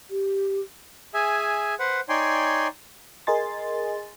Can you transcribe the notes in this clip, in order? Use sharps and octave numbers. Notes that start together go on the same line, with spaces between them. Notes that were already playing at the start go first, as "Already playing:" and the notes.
G4
G#4 E5 G#5
B4 C5 F#5
D#4 C#5 D5 G5 G#5 C6
G#4 A#4 D#5 G#5 C6 A6